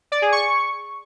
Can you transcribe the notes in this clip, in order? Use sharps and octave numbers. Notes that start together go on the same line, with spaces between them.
D5
G#4
C#6